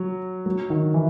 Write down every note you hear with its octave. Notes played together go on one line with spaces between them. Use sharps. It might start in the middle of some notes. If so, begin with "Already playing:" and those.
Already playing: F#3
F#3
D#3
E3